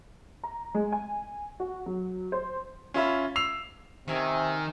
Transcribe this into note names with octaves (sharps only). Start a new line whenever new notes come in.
A#5
G#3
G#5
F#4
F#3
C5
C#4 F4 E5 B5
E6 C7 F7
C3 D#3 C#4 G#5 E6